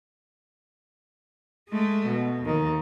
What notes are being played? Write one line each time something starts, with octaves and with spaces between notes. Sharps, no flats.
G#3 A3
B2
D#2 D#3